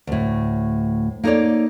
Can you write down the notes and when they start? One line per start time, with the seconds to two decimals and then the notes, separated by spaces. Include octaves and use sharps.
0.07 D2 A2
1.23 A#3 D#4 A4 B4 C#5 D5